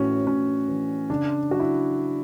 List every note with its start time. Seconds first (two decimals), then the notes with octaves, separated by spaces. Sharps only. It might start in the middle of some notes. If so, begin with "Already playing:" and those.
Already playing: A2 E3 C#4 F#4
0.27 A2 C#4
0.68 E3
1.10 C#3 D4
1.51 F#3 F#4
1.60 E4